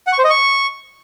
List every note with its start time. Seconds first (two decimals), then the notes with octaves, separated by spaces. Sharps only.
0.07 F#5
0.13 C#6
0.18 C5
0.24 D#5
0.30 C#6